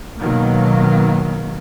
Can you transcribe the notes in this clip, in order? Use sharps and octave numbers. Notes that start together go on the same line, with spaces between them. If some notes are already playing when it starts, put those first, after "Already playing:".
B2 D#3 F#3 A#3